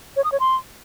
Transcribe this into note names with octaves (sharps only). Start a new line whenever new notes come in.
C#5
D#6
C#5
C6